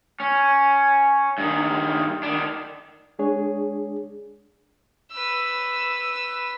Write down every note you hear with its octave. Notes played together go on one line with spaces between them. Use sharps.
C#4
G2 D#3
D#3 D4
G#3 D4 G#4 C#5
B4 E6